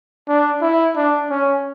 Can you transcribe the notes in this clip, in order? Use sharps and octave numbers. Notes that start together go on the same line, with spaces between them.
D4
E4
D4
C#4